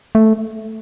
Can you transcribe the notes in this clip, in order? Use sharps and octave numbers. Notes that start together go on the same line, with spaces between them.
A3